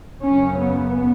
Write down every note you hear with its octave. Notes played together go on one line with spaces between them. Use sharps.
F#2 C#3 C#4
B3